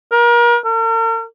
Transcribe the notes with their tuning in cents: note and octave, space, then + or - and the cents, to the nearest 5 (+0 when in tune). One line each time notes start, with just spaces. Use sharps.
A#4 +35
A#4 -45